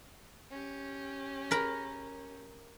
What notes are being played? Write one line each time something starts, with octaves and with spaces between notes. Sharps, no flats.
C#4 G4
A#4 B5